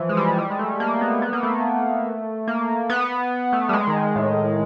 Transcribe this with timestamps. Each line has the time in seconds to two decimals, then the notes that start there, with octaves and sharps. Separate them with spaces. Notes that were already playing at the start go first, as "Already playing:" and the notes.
Already playing: E3 F3
0.09 G#3
0.17 G3
0.38 G3
0.50 G#3
0.59 A3
0.80 A#3
1.01 B3
1.22 B3
1.33 A#3
1.43 A3
2.48 A#3
2.90 B3
3.53 A3
3.69 G3
3.73 G#3
3.87 D#3
4.16 A2